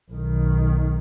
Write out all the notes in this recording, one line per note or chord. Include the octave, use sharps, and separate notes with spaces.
B1 D#3